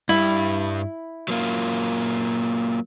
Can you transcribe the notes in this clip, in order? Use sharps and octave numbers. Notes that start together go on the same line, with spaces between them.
G2 G3 E4
F#3 A#3 F4